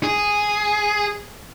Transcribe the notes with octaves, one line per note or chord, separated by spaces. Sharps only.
G#4